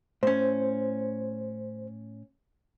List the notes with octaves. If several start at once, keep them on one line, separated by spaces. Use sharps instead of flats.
A2 C#4 C5